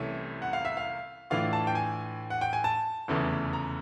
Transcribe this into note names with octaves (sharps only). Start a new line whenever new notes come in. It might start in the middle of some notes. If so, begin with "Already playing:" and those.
Already playing: C2 C3 E3 A3 C#4 E5
F#5
F5
E5
F5
A2 E3 A3 D4 F4 F5
A5
G5
G#5
F#5
G5
G#5
A5
F1 E2 C#3 E3 A3
A#5